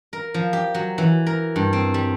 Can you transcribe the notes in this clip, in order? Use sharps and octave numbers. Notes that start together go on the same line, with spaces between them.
A#4
F3
G4
F#3
E3
A#4
G2
C4
G3